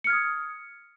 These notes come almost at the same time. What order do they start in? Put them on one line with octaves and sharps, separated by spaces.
C#7 F6 G#6 D#6